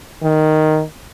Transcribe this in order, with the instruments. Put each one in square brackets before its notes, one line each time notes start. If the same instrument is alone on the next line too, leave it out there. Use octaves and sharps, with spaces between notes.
[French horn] D#3